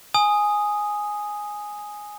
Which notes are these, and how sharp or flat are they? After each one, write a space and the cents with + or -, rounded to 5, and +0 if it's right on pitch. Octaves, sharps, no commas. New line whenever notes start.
G#5 +0 D#6 +0